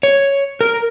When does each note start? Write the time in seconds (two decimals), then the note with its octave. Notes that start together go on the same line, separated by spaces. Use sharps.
0.03 C#5
0.61 A#4